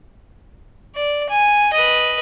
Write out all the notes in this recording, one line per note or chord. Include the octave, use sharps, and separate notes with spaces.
D5
G#5
B4 D#5